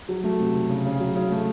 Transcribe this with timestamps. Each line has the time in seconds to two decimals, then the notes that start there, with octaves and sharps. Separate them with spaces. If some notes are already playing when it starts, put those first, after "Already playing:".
0.09 F#3
0.24 A3
0.40 C3
0.54 C3
0.69 C#3
0.85 C#3
1.00 F#3
1.16 C#3
1.31 A3